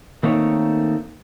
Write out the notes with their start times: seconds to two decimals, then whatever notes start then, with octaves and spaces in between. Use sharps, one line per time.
0.23 D#3 A3 A#3 C4 D#4 C#5